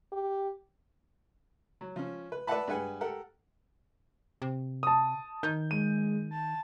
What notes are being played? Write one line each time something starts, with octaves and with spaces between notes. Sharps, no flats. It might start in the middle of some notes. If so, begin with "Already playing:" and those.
G4
F#3
F3 C#4
B4
B4 D5 E5 F#5 A5 B5
G2 G#4 B4 F#5 G#5
G4 A4 A#4 F#5
C3
A5 D#6
D#3 G6
G#3 D#7
A5